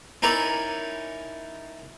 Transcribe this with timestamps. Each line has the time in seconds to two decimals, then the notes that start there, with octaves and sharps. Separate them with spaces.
0.22 C#4 D#4 E4 A#4 D5